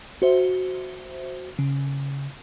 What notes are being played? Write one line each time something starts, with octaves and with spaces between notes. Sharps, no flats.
F#4 C5 E5
C#3